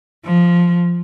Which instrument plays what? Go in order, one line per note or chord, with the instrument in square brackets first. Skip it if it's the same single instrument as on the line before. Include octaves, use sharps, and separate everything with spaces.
[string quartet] F3